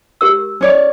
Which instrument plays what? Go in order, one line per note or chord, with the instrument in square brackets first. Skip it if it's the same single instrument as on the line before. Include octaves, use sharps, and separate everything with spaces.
[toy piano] G4 A#4 E6
[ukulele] C#4 C#5 D5